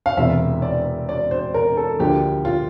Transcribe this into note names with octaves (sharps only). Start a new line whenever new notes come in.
F5
E1 E2 C3 E5
D5
D5
C5
A#4
A4
D2 D3 F3 A#3 G4
F4